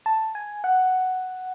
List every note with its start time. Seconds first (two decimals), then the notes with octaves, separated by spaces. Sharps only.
0.06 A5
0.35 G#5
0.64 F#5